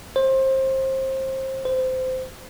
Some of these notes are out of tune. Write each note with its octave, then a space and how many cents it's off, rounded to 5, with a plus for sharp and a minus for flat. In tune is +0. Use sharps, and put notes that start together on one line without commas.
C5 +25
C5 -20